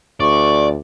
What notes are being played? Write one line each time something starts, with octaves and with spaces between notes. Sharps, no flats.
D2 D5 C#6